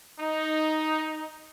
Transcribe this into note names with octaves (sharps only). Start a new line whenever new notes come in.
D#4